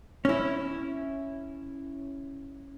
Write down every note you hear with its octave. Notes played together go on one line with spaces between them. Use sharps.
C#4 E4